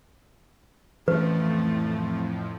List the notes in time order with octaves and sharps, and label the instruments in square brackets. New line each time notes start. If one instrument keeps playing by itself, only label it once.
[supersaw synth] F2 A2 F3 [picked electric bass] E3 C#4 [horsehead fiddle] A3 [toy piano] B4